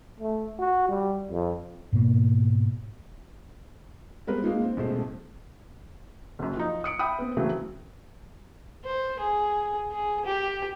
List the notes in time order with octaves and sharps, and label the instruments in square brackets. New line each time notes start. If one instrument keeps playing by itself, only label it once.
[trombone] A3
F#4
G3
F2
[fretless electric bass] G#2 B2 A#3
[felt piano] G3 G#3 B3 C4 A#4 B4
G#3 A#3 D#4 F4
C4
D#1 B1 A2 G#3 A3 C5
F#1 F#2
F3 D#4
D#6 C#7 D7
E5 G5 B5 D#6
B3 C4
C#3 E3 F#3 A3 C4
[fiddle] C5
G#4
G#4
G4